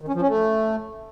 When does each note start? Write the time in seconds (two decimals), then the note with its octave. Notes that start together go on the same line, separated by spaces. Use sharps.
0.01 D#3
0.08 C#4
0.15 F3
0.22 C#4
0.28 A3